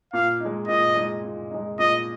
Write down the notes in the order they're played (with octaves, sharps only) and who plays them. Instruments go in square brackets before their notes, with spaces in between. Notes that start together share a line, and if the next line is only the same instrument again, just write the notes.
[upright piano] A#2 [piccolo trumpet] F5
[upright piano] G#3 D#4
[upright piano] A#2 [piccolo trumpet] D#5
[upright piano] G#3 D#4
A#2
G#3 D#4
[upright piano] A#2 [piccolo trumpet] D#5